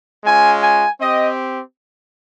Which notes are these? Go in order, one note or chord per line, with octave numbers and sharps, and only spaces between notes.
G#3 C#4 F4 G#5
G#5
C4 G4 D#5